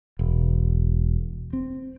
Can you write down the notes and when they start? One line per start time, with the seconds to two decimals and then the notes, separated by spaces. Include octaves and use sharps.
0.19 E1
1.53 C4